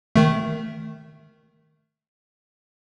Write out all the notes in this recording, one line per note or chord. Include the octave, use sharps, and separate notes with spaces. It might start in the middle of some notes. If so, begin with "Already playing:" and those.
D#3 A3